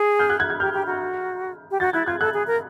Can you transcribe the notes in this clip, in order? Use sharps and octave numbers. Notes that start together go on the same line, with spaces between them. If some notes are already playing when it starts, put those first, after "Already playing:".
Already playing: G#4
F6 G6
F#6 G#6
F#6 G#6
F#6 G#6
G4 F6 G6
G4
F#4
G4
F#4 G6 A6
E4 F#6 G#6
F4 F#6 G#6
A4 F#6 G#6
G#4
A#4